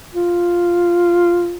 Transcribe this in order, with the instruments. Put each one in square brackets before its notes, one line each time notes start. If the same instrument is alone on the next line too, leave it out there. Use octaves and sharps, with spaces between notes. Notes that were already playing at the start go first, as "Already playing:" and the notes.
[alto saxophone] F4